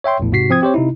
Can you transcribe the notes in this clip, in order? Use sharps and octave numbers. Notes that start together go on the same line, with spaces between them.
C#5 E5 G5 C6
A#1 E2 A2
G#2 C3 F#4 B6 C7
F3 C4 D#6 G#6
C4 G4 C5 C#5
C3 D#4 E4